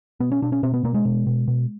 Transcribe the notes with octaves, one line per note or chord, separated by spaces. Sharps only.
B2 B3
C#4
B2 D4
C#4
B2 C4
B3
B2 A#3
G#3
B2
B2
B2